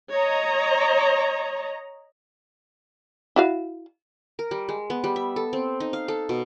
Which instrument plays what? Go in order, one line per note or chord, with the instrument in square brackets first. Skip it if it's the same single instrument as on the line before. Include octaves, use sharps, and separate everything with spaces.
[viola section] C#5 D#5 A#5
[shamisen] E4 F#4 F5
[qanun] A#4
G3
G#3
B3
G3
E5
A4
C4
D#4
F5
A4
B2